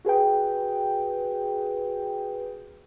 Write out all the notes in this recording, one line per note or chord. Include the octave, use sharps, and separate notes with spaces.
F#4 G#4 B4 G5